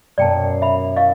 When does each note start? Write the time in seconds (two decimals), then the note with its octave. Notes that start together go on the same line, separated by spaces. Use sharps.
0.18 F#2 B2 A#3 D5 G5 A5
0.43 C7
0.62 E5 B5
0.96 E4 F#4 C#5 D#5 F5 C#6